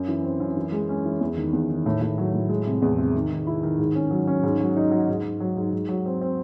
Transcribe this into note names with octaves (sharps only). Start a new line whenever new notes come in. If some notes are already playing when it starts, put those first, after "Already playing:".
Already playing: F#2
E3
C4
F#2
E3
G#3
C#4
E3
E2
D#3
E2
D#3
A2
A2
F#3
A2
G#3
C3
E2
C3
D#3
D#3
E4
D#3
G#2
C#4
F#3
C#4
G#2
F#3
D#4
F#3
G#2
G#2
F#3
G#2
G#2
F#3
C4
C4